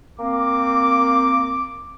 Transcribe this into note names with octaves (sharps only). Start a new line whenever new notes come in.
A#3 C4 D6